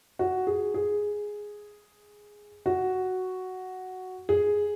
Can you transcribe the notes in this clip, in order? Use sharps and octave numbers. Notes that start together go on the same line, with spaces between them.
F#4
G#4
G#4
F#4
G#4